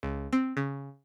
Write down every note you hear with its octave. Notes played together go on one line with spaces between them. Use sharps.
C#2
C4
C#3